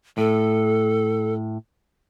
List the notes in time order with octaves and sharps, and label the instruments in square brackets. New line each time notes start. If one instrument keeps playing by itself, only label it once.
[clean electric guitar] A2 [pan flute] A4